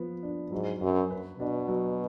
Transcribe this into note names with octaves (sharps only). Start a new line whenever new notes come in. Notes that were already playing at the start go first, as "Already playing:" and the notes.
Already playing: F3 B3
D4
G#2 F#3
F#2 F#4
B4
B2 D4
F#3